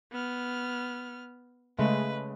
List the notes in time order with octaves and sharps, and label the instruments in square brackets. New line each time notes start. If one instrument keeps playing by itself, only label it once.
[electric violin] B3 F6
[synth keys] C#3 G#3 A3 [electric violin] B4